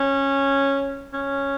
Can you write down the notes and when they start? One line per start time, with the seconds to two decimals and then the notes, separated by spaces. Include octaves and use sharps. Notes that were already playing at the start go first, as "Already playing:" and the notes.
Already playing: C#4
1.13 C#4